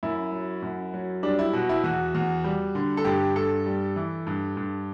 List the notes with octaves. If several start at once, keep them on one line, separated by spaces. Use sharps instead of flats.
F#2 E4
F#3
F#2
F#3
G3 D4
E4
B2 F#4
E4
E2 F#4
E2
G3
D3
A4
G2 G4
G2 A4
G3
E3
G2
G2